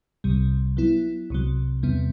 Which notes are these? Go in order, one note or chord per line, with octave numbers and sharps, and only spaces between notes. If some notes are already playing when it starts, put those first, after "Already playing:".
C2 C3 G3
F#3 B3 E4
C2 C3 F#3
E2 C3 G3 B3